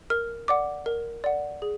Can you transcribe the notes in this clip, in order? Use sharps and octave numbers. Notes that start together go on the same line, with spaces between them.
A#4 F6
D5 F#5 D6
A#4
D5 F#5
G#4